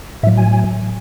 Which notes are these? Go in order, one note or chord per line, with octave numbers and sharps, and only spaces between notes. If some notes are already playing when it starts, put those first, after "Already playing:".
A2 F#3 E5
G#5